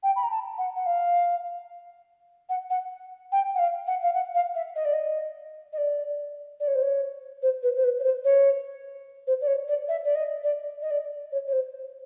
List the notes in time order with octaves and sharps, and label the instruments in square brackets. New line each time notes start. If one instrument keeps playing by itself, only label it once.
[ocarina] G5
B5
A#5
A5
F#5
F#5
F5
F#5
F#5
G5
F#5
F5
F#5
F5
F#5
F5
E5
D#5
D5
D#5
D#5
D5
D5
C#5
C5
C#5
C5
B4
C5
B4
C#5
C5
C#5
C5
D5
C#5
D5
E5
D5
D#5
D5
D#5
D5
C#5
C#5
C5